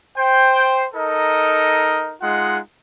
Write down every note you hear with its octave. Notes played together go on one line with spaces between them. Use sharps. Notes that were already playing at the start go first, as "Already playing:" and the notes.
C5 G5
D#4 A4 A#4 D#5
G#3 D#4 F4 F#5